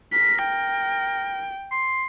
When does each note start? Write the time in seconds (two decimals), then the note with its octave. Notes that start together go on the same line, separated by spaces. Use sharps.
0.13 A#4 B6
0.44 G5
1.71 C6